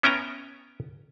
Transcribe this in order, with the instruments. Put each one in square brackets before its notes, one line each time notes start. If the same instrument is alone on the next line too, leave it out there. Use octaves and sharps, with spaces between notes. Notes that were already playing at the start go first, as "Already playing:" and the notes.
[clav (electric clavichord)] B3 C#4 E5 G5 G#5 A#5